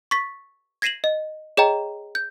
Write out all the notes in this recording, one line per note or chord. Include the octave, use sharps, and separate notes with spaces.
C#6 A6 B6
G#6 A#6 C7 D#7 E7 F#7
D#5
G#4 C#5 D#5 G5 A#5
G6